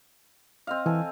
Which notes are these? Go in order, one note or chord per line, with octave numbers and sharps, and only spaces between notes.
C4 D#5 F5
E3 A4 G#5